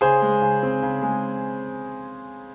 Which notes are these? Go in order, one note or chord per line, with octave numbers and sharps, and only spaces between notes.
C#3 G#4 C5
G#3
C#3
C4
C#3
G#3